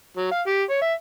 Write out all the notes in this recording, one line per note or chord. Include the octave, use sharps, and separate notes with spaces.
F#3
F5
G4
C#5
E5